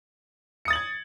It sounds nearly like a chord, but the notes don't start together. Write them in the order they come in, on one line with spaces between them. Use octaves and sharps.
C#7 D#6 A6 F#7 G#6